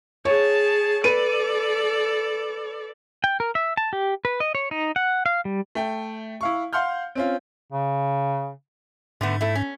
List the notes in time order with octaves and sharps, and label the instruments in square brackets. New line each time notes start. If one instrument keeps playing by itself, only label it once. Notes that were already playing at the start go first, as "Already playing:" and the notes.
[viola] G#4 A5 [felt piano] C#5
[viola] A4 D5 [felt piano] B4 D#7
[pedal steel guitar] G5
A#4
E5
A5
G4
B4
D#5
C#5
D#4
F#5
F5
G3
[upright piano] A3 G5
E4 F5 C#6
F5 F#5 C6 F6 G6
C4 C#4 F4
[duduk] C#3
[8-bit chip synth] G#2 [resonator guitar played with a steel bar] D3 A3 B3
[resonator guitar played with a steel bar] A3 E4
C#4